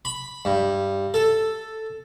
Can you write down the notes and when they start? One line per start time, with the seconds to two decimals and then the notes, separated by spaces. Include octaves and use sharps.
0.05 B5
0.45 G2
1.14 A4